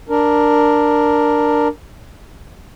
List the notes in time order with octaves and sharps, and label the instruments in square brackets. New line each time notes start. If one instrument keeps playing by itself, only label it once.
[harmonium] D4 A#4